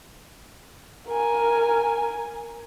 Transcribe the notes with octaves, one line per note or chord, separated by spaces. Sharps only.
A#4 G#5